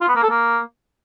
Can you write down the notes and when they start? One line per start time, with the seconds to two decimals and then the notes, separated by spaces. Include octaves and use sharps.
0.01 F4
0.09 B3
0.16 A#3
0.23 A4
0.30 A#3